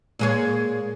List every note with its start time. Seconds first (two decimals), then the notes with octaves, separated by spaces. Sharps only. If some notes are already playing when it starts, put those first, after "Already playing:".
0.19 A#2 G#3 C#5